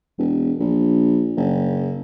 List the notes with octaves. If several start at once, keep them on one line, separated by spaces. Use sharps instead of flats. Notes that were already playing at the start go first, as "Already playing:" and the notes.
E1
A#1
F#1